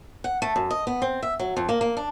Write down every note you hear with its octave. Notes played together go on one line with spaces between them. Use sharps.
F#5
A3
F#2
D#5
B3
C4
E5
F#3
F2
A#3
A#3
D4